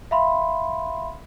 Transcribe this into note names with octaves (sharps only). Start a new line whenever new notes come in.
E5 F5 B5 C6